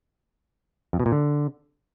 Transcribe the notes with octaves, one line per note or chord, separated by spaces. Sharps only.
F2
B2
A#2
D3